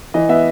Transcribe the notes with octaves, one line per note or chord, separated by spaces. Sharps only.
E3 D#5
B3 E5